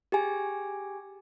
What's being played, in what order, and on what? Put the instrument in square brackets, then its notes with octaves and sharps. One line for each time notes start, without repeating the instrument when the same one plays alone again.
[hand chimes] G4 G#4 G#5